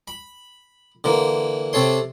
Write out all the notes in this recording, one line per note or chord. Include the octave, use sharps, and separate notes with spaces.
B5
D3 E3 A#3
C3 A4 C#5 C6